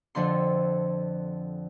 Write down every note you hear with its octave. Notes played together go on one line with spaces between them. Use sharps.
F2 D3 F3 D4 C6